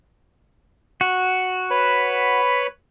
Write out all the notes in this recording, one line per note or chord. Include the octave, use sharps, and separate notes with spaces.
F#4
B4 C#5 B5